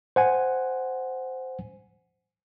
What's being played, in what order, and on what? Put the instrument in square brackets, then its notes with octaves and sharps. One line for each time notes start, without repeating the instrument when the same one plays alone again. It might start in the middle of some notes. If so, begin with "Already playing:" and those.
[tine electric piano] C5 F#5 G#5